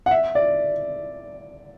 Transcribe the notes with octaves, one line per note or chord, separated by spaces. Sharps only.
F#5
E5
D5